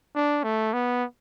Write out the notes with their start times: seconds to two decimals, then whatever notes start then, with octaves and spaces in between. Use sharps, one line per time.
0.15 D4
0.44 A3
0.73 B3